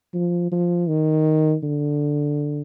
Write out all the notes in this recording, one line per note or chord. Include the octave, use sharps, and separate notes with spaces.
F3
F3
D#3
D3